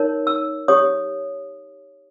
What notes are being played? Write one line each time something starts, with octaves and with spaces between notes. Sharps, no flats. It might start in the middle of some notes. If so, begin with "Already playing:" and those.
Already playing: D#4 A#4 C#5
E6
G4 C#5 D#6